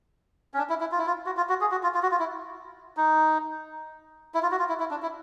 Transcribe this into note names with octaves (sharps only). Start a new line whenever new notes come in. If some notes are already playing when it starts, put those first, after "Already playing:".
C#4
D4
E4
E4
F4
E4
F4
F#4
F4
F#4
G#4
F#4
F4
F4
F#4
F4
E4
D#4
E4
F4
F#4
F4
E4
E4
D4
E4